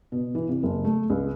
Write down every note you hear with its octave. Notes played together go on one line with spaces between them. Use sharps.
B2
E3
C3
F#1
A3
C#2